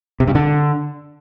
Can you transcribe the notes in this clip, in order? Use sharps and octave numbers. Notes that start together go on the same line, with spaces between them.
C3
G2
D3